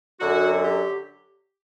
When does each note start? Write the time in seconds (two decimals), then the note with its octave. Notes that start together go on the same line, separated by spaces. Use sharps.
0.20 F#2 D3 F#3 F#4
0.64 G4